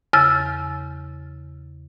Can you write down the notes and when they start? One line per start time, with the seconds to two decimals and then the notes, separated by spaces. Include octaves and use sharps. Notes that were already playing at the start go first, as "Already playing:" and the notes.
0.13 E2 C#3 E6 F6 A6